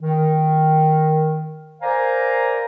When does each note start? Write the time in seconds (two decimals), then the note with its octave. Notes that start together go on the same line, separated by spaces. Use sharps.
0.01 D#3
1.82 A#4 C5 D5 F5 G#5 A#5